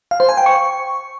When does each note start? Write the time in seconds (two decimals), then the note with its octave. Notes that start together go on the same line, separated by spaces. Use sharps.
0.11 F5
0.20 C5
0.29 G#5
0.37 G5
0.46 C#6